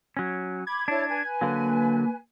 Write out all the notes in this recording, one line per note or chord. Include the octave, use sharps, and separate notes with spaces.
F#3 C#4
B5 D6 G#6
D4 E4 C#5 A5
B4 G#5
D3 F#3 A#3